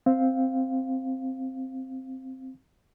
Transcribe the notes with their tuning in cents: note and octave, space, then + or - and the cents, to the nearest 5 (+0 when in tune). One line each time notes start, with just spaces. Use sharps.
C4 +0 F5 +0